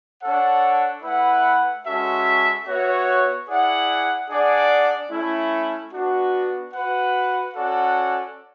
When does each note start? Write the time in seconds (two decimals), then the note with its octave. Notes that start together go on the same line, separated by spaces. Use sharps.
0.22 D4 A4 C#5 F#5
1.03 A3 E4 B4 F#5
1.85 G#3 C#4 F#4 A4 E5
2.66 B3 F#4 C#5 E5
3.47 E4 G#4 D5 F#5
4.29 D4 G#4 D5 F#5
5.10 A3 C#4 E4
5.92 B3 D4 F#4
6.73 F#4 B4 F#5
7.54 C#4 F#4 A4 D5 F#5